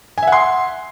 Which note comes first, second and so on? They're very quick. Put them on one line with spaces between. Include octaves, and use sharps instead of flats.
G#5 E5 F#5 C6